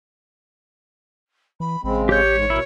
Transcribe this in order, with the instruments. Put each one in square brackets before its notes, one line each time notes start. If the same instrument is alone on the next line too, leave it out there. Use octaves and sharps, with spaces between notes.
[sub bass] E3 [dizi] B5
[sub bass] A1 [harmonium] C#3 G#3 C4 [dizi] B5
[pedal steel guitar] G4 G6 [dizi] C#5
[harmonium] G#2 G#3
[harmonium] B2 A#4 [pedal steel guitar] E4